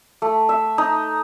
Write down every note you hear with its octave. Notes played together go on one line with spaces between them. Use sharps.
A3
E5
D#4